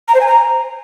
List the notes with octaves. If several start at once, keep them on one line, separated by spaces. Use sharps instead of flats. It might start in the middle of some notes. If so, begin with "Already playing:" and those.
A#5
C5
G#5
A#5